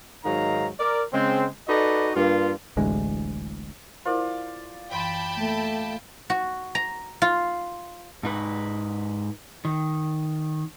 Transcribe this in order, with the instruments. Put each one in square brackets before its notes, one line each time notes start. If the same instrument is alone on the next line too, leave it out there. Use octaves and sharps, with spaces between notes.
[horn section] G#2 D#3 F#3 D#4 F5 A#5
A#4 D5
C#3 G#3 C4
D#4 F#4 A4 B4 D5 D#5
G2 A#3 F4
[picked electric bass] D1 A1 D2 G#3
[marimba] E4 A#4 C5 [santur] F4 D5
[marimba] F#2 E3 C6 [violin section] G5 A5 B5
[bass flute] A3 [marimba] A#3
[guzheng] F#4
A#5
F4
[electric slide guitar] G#2 D#4 B4
D#3